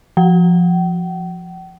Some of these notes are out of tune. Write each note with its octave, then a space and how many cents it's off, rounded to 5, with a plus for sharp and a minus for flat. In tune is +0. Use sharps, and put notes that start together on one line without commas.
F3 +0 G5 -45